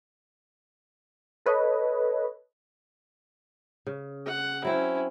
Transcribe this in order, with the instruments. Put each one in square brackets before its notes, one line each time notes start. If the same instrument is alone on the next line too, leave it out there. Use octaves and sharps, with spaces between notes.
[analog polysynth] A4 B4 C#5 D#5
[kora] C#3
[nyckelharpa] F#5
[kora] F#3 C4 [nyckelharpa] C#4 E4